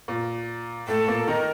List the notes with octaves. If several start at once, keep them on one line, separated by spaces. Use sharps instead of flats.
A#2
A2 A3 A4
A#2 A#3
D#3 D#4 A#4